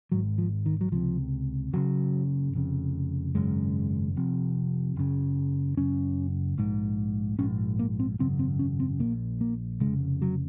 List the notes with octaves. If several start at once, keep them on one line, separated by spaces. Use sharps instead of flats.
G#1 G#2 F#3
F3
D#3
F#3
C#2 C3 F3
F#1 F#2 C#3 F#3
F1 F2 C#3
G#1 F#2 C#3 G#3
F1 F2 C3
F#1 F#2 C#3
F#1 F#2 C#3 C#4
A#1 G#2
A#1 G#2 C#4
A#3
C4
G#1 F#2 C#3 C4
C4
C#4
C4
A#1 A#2 A#3
A#3
F1 D#2 C#3 G#3
F#3